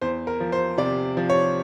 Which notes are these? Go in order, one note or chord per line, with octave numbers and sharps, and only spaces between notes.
E2 C5
A#4
F3
C5
C3 D5
F3
C#5